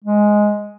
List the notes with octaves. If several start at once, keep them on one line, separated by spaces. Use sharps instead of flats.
G#3